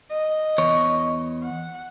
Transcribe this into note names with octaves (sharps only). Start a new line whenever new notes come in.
D#5
E2 C#5
F#5